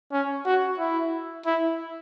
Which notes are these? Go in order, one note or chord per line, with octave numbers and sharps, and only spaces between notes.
C#4
F#4
E4
E4